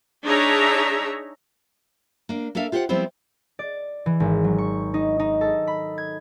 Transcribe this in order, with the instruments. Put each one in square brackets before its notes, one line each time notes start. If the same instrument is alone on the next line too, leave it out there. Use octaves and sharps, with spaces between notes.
[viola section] D4 D#4 G#4 C#5 E5 A#5
[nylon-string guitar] A#3 D4
A#3 D4 A4 E5 F5
F4 G4 C5 E5 F#5
F3 G3 B3 C4 E4 C5
[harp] D5
E3
G#1
F#3
C#6
D#4
D#4
A4
B5
G#6